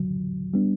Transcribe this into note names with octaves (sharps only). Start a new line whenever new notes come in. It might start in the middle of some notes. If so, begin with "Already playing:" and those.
Already playing: D2 D3 F#3
G3 B3 D4